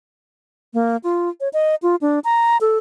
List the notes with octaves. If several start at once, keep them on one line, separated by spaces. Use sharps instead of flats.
A#3
F4
C#5
D#5
F4
D4
A#5
A4